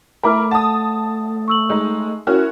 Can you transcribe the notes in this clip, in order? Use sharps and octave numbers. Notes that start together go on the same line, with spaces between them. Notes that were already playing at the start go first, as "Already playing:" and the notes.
A3 E4 A#4 B5 D6 F6
F#5 A5 D#6
C#6 E6 F#7
G#3 D#4
C#4 E4 F#4 A#4 F6